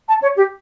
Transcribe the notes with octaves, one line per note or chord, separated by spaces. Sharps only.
A5
C#5
G4